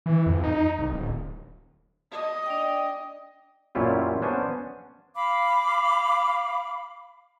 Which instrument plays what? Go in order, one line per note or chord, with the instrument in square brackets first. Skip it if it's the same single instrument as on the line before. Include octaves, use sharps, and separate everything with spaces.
[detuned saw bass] E3
F2
D#4
C2
D1
[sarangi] D#5
[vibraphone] D4 D5 G5
[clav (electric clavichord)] F#2 A#2 C#4 E4 F4 G4
B3 C#4 D4 C5 G#5
[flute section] F5 B5 D6